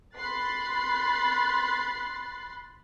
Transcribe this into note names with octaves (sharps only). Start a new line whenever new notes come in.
B5 C6 F#6 A6 C7